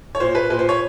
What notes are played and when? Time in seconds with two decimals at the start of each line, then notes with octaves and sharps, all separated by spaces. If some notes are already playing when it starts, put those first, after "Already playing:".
0.15 C#5
0.20 A#2 C5
0.35 B4
0.50 A#2 B4
0.59 C5
0.69 C#5